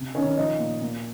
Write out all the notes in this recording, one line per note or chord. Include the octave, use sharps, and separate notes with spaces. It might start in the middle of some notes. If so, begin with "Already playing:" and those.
Already playing: C3
D#3 C#4
F3 D#4
A#2
A#2